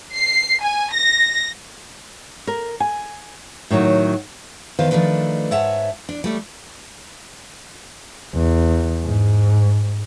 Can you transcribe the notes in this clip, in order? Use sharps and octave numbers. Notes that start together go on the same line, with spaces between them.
C7
G#5
A#6
A#4
G#5
A2 D#3 F3 F#3
E2 D#3 B4 C5 F5
D#3 F3 A3 D4 B4
G#2 C#5 E5 F#5 A5
D4
G3 A3 C#5
E2
G#2